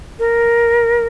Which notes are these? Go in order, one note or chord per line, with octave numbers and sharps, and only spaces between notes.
A#4